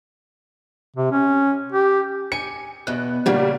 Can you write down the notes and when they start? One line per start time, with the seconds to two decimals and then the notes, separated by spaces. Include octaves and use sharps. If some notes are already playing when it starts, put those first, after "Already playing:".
0.96 C3
1.11 C#4
1.72 G4
2.32 G#5 C#7
2.87 E2 B2 F#6
3.26 A#2 C#3 G3 A#3 F#4